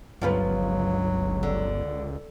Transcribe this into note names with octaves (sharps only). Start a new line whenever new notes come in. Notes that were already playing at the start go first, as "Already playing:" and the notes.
G1 C#2 F3 F#3 F4 B4
D3